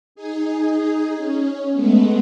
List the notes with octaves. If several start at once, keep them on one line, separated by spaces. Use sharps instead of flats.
D#4 G#4
C#4
G#3 A3 B3